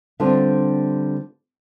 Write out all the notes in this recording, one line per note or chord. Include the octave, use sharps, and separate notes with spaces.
D3 G3 B3 C4 D4 F4